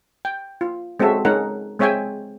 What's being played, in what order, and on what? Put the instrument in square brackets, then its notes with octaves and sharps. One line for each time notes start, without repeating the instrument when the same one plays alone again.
[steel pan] G5
F4
G#3 C4 C#4 F#4 A4 E5
G#3 C#4 D#4 A#4 F#5
G#3 C4 C#5 E5 G5 G#5